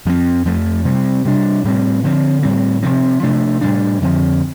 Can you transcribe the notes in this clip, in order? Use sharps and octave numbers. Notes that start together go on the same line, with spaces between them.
F2 F3 C4
F2 F3 A3
C3 G3 C4
C3 G3 D4
A2 G3 C4
D3 F3 C4
A2 G3 C4
C3 F3 C4
C3 F3 A3 D4
A2 G3 D4
F2 D3 F3 C4